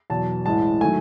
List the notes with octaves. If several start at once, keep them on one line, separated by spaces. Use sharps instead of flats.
E2 B2 F#3 A5
A1 A2 E3 G#3 A5
D#3 F#3 A3 G#5